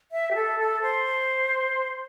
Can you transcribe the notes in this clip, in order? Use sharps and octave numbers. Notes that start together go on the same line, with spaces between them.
E5
G4
A4
A4
C5